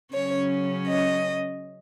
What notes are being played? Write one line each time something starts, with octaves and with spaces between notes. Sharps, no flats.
C#3 F#3 C#4 C#5
D#5